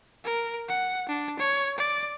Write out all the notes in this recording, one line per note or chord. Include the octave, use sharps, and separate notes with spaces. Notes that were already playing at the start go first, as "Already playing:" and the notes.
A#4
F#5
D4
C#5
D5